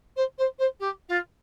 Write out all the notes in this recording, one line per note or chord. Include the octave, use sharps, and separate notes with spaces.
C5
C5
C5
G4
F4